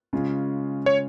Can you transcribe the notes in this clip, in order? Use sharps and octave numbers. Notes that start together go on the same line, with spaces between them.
C#3 G#3 C#4 F4
C#5